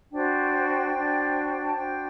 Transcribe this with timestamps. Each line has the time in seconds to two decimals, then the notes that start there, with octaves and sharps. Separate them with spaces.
0.11 D4 F#4 C5 G5
0.92 D4 F#4 C5
1.62 A5
1.73 D4 F#4 C5 G5